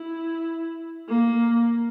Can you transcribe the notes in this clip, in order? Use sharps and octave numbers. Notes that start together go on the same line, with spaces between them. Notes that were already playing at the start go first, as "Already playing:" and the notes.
Already playing: E4
A#3